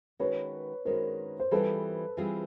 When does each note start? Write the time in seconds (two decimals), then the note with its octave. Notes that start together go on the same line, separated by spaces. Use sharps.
0.19 D#3 G#3 C#4 F#4 B4 C#5
0.85 D#3 G#3 C#4 F#4 A#4 C5
1.40 C5
1.51 E3 G3 C4 F4 G#4 A4 B4
2.17 E3 G3 C4 F4 G#4